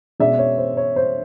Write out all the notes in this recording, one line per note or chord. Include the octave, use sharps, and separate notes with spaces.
B2 G#3 C#4 D5 E5
C#5
C5
C#5
C5